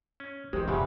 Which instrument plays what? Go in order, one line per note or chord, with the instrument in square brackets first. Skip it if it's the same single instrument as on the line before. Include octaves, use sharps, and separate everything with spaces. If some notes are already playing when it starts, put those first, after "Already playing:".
[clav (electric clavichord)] C#4
[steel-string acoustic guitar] D#3 C4 [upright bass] E3 [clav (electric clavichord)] G#3 [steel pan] G4
[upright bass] F1 [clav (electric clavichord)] E2 A#2 C#3 [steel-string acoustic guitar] G3 B4